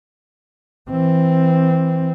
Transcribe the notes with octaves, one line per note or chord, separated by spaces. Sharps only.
E3 C4